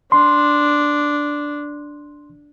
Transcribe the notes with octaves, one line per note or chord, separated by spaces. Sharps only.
D4 C6